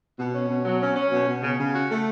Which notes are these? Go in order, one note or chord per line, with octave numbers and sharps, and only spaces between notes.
B2
C#4
B2
F#3
C#4
C#4
B2
B2
C#3
C#3
F#4
A3